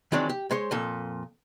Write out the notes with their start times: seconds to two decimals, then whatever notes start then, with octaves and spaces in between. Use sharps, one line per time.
0.12 D#3 E3 F#3 G#3 C4 D4
0.29 G4
0.51 G#3 C5 C#5
0.71 F2 A#2 A4